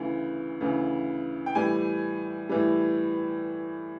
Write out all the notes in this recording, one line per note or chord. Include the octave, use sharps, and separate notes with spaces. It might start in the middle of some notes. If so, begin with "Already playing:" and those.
Already playing: D2 C#3 E3
D2 C#3 E3
G5
A2 E3 G3 G#5
A2 E3 G3